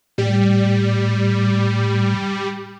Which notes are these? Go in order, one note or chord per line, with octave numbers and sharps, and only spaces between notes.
A2 G3